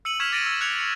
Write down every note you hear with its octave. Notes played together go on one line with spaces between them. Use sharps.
E6 C#7 D#7 F#7
C#6 F6 G#6 B6 E7 F7
D6 A6 A#6 D7 D#7
E6
F#6 G#6 C#7 F7
C#7